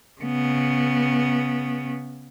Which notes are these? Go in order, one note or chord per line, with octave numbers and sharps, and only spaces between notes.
C#3 B3